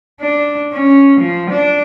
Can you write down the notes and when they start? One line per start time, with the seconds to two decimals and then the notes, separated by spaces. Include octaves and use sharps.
0.21 D4
0.73 C#4
1.20 F3
1.51 D4